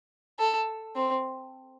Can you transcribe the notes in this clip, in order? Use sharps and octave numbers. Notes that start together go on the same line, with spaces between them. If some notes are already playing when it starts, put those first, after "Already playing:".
A4
C4